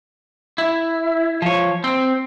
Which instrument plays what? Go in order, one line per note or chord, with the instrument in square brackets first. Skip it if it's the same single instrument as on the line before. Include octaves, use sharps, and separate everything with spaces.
[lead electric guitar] E4
F3 C#5
C4